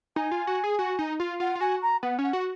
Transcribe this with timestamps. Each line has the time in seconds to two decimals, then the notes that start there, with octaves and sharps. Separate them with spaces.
0.16 D#4 G#5
0.31 F4
0.47 F#4
0.64 G#4
0.79 F#4
0.99 D#4
1.20 F4
1.40 F4 F#5
1.55 F4
1.61 F#4 G#5
1.82 A#5
2.02 B3 F#5
2.19 C#4 F#5
2.33 F#4